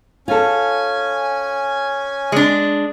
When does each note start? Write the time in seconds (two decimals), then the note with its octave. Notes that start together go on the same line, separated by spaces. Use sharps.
0.28 C#4 F4 A4 G#5
2.32 G#3 D4